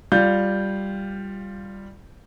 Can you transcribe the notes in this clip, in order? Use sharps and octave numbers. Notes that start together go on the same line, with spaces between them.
G3 F4 F5 G6